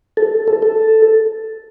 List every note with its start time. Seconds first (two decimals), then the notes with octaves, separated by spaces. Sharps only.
0.17 A4
0.47 A4
0.62 A4